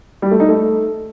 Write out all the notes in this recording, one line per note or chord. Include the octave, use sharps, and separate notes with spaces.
G3
A3
D#4
A3